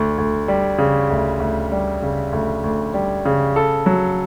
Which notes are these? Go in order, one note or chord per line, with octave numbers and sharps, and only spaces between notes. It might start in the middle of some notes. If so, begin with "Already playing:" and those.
Already playing: D2
D2
G3
C#3
D2
D2
G3
C#3
D2
D2
G3
C#3
A4
F#3